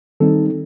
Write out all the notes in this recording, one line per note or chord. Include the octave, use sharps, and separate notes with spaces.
D#3 G3 C4 D#4 A4